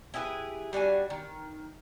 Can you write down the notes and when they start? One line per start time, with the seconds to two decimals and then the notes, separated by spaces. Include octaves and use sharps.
0.14 E4 G4 G#4 B4
0.73 G3 D4 F#4 G#5
1.10 D#3